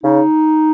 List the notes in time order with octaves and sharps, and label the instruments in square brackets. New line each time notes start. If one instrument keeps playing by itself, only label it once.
[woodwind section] C#3 D#4